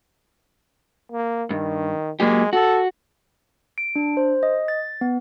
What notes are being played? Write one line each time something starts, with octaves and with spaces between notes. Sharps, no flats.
A#3
G2 D#3
F#3 G#3 A#3 G4
F#4 A4
D7
D4
C5
D#5
A6
B3